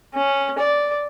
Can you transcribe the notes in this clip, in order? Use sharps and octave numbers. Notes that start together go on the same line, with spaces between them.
C#4
D5